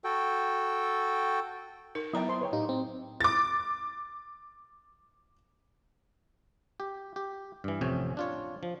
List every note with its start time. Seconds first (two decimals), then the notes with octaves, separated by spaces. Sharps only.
0.04 F#4 A4 G5
1.95 D#4 A#4
2.13 F#3 B3 E4 D5 G5 A#5
2.29 C5 A5 C6
2.41 G#4 B4 C#5 G5
2.53 A2 D#4 G4 F5
2.69 C4
3.20 D6 A6
6.80 G4
7.16 G4
7.64 G2 E3
7.81 A1 F2 C3 C#4 G5 G#5
8.17 D4 F4 C#5
8.63 F3